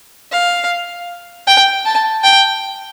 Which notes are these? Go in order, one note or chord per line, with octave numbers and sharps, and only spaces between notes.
F5
G5
A5
G5